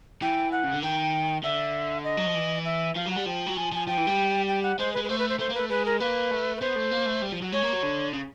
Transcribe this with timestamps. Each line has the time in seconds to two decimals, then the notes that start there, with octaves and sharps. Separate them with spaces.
0.22 E3 G5
0.52 F#5
0.64 C#3
0.73 D3
0.83 D#3 G5
1.44 D3 E5
2.04 D#5
2.17 F#3
2.26 F3
2.35 E3
2.65 E5
2.96 F3 F5
3.06 F#3 F#5
3.16 G3
3.26 F3 G5
3.47 F#3
3.56 F3 G#5
3.72 F3 G#5
3.87 F3 G5
3.97 E3
4.07 G3
4.48 G5
4.63 F#5
4.79 G#3 C5
4.93 B4
4.97 G#3
5.04 B4
5.09 A3 C5
5.19 B4
5.29 C5
5.39 A3 C5
5.50 A#3
5.55 A3 B4
5.69 G#3 B4
5.86 A#4
6.00 A#3 B4
6.31 A3
6.57 B4
6.61 B3 C5
6.76 A3
6.91 A#3
7.06 A3
7.22 G3
7.32 F3
7.42 F#3
7.52 G#3 C#5
7.63 A#3
7.73 F#3
7.83 D3
8.13 C#3